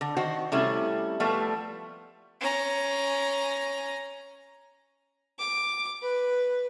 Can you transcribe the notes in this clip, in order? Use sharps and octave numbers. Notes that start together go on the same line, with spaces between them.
D3
D#3 F#4 C5
C3 G3 A3 C#4 E4
F3 G3 A3 B3
C#4 A#5
D6
B4